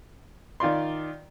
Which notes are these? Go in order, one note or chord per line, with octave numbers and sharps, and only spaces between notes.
D#3 F4 D5 C6